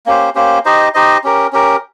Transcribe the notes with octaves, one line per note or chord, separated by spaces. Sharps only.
A#3 C#4 G4 C5
A#3 C#4 G4 C5
D#4 G4 C5 D#5
D#4 G4 C5 D#5
C#4 G4 A#4
C#4 G4 A#4